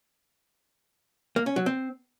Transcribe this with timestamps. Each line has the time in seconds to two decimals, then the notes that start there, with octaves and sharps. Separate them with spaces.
1.36 A#3
1.46 C#4
1.56 F#3
1.66 C4